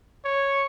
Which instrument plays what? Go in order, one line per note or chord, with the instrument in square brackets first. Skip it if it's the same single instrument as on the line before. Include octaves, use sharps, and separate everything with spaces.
[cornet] C#5